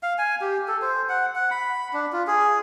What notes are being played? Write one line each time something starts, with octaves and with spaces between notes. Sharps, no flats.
F5
G#5
G4
A4
C5
F#5
F#5
B5
D4
F4
G#4